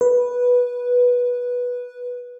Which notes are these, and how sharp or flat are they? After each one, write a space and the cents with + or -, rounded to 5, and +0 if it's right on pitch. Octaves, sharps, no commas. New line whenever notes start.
B4 -10